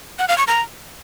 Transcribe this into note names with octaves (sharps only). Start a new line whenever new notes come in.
F#5
F5
C#6
A#5